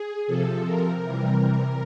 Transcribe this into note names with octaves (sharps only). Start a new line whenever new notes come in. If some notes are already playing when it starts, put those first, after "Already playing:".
Already playing: G#4
C3 F3 A4
A#4
C3 E3 G3